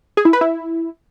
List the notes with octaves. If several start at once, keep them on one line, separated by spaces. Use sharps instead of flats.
G#4
E4
B4
E4